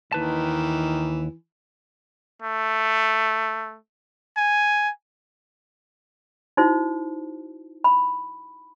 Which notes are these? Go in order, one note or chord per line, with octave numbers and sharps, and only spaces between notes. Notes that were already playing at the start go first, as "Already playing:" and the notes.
D#2 D#3 E3 B4 A5
A3
G#5
D#4 E4 F#4 C5
B5